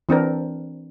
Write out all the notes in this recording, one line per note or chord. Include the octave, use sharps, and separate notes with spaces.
E3 C4 D4 A#4